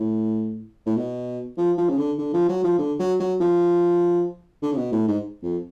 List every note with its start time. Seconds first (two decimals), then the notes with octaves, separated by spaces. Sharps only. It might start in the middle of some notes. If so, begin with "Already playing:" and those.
Already playing: A2
0.86 A2
0.97 B2
1.58 F3
1.78 F3
1.89 C#3
1.98 D3
2.18 D3
2.33 F3
2.49 F#3
2.64 F3
2.79 D3
2.99 F#3
3.20 F#3
3.40 F3
4.62 D3
4.72 C#3
4.77 B2
4.92 A2
5.08 G#2
5.43 F2